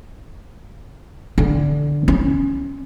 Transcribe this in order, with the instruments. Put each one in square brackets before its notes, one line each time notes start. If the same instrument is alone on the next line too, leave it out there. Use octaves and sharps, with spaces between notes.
[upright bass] D3
C#4